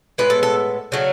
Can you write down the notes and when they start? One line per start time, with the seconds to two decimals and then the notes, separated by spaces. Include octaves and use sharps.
0.18 A2 G#3 B3 B4
0.30 A4
0.43 A4
0.92 C#3 F#3 A3